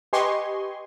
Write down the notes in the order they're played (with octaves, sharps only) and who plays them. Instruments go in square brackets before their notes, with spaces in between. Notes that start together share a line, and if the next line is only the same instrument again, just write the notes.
[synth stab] G4 B4 D#5 G#5 C6 C#6